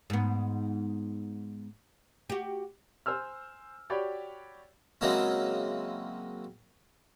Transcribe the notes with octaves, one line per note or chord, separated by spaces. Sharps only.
G#2 B3
F#4 G4
C5 G#5 E6 F6
F#4 G4 C#5 D5 G5 B5
C#3 F#3 G#3 A#3 C4 E4